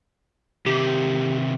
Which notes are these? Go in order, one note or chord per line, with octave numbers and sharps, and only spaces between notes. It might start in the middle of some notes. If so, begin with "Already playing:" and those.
C3 D#3 G4